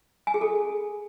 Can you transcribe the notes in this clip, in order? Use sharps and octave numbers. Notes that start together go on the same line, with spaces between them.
G#5
G#4
A4